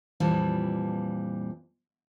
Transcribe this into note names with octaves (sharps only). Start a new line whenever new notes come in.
F2 A#2 E3 G3 A5